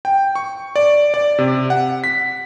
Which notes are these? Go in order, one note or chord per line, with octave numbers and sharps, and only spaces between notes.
G5
C#6
D5
D5
C3
F#5
B6